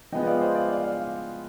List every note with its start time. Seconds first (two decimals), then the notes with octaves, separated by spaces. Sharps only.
0.12 F3 G#3 B3 D#5 G5
0.27 D5 F5
0.41 C5 D#5
0.55 D5 F5
0.69 D5 F5
0.83 D5 F5